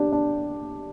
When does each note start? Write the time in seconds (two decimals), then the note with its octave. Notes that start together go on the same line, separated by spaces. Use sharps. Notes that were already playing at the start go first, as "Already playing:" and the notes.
Already playing: D4 G4
0.12 D4